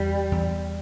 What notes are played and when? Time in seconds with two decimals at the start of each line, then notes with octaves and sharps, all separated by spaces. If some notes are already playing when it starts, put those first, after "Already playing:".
Already playing: E2 G3
0.32 E2